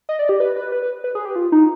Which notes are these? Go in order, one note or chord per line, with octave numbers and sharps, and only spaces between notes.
D#5
D5
G4
B4
B4
B4
B4
B4
G#4
G4
F4
D#4